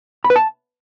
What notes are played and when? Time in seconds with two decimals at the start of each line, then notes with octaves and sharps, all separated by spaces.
0.24 B5
0.30 B4
0.36 A5